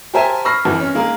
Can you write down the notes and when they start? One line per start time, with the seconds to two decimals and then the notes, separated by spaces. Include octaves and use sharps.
0.14 G4 A#4 C5 E5 G#5 A5
0.45 B5 C#6 E6 F6 A#6 C7
0.65 G#1 E3
0.80 C#4
0.95 D#3 G#3 A#3 G#4 A#4